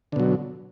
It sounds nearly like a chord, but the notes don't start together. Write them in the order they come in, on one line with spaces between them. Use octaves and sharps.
D3 B2 F#3